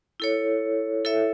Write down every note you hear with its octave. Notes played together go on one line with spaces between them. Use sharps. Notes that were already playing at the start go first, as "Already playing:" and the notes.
E4 A4 C#5
E4 A4 C#5 E5